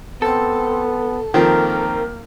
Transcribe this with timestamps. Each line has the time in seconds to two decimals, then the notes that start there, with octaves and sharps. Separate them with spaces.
0.22 B3 C4 A4
1.34 D#3 F3 A#3 C4 A#4